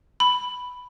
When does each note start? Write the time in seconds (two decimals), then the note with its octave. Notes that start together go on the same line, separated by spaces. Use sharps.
0.20 B5